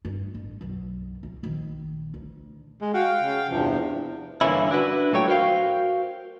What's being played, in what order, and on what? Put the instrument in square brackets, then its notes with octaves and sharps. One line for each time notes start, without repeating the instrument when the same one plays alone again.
[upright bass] G2
A1
B1 F#2
C#2
A#1 D#3
D2
[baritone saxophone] G#3
[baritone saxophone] F#4 [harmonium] F5 G5
[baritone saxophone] C#3
[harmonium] E2 G2 C3 [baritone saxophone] F3
[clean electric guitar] G2 D3 E3 A#3 C#4 E4
D4 E4 F#4 B4
A#2 F#3 A3 C#5 G5
F#4 A#4 C5 D5 F5 G5